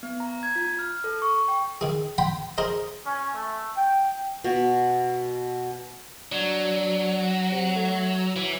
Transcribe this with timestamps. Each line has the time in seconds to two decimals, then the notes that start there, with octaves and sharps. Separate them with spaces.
0.03 B3
0.20 A#5
0.43 G#6
0.56 F4
0.79 F6
1.04 A4
1.22 C#6
1.48 G5
1.81 D#3 G#4
2.18 F#5 G5 B5 C6
2.58 G#4 A#4 C5 D#5
3.05 C#4
3.34 A3
3.76 G5
4.44 B2
6.32 F#3 D4
7.51 C3
7.76 A3
8.36 E3 F#3